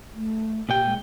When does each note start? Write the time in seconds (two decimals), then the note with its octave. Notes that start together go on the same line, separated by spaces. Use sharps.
0.14 A3
0.69 A#2 G4 G5
0.86 G#3